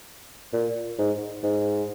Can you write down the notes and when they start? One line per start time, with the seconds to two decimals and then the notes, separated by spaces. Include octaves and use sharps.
0.53 A#2
0.98 G#2
1.43 G#2